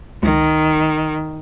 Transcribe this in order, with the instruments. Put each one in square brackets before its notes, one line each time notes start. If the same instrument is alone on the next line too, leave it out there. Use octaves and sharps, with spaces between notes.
[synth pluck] C#2 [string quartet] D#3